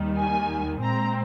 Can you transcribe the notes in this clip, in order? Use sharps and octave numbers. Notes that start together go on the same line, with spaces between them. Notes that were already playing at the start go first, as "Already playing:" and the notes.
Already playing: D#2 D#3 G3
G#5
A#2 G#3 C4 A#5